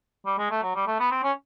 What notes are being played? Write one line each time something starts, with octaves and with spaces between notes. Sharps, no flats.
G3
G#3
A3
F#3
G3
A3
B3
C4
C#4